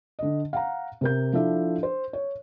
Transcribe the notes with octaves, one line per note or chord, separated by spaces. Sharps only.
D3 D#5
F5 F#5 A#5
C3 A#4 G6
F3 D4 E4 A4 E5
C5
C#5